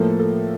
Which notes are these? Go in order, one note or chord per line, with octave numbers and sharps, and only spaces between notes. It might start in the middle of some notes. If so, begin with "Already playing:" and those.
Already playing: A2 F3 A#3 A4
A4